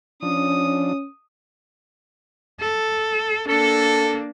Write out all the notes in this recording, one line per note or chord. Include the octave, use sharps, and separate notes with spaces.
F3 C#4 D4 D#6
A4
A#3 D4 A4